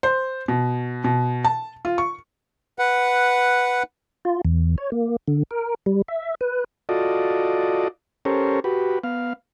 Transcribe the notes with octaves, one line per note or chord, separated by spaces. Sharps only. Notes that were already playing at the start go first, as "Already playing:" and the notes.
C5
B2
B2
A5
F4
C#6
B4 F#5
F4
E2
C#5
A#3
D3
A#4
G3
E5
B4
F4 F#4 A4 D5 D#5
C#4 G4 A4 A#4 C5 C#5
F#4 G4 B4
B3 F5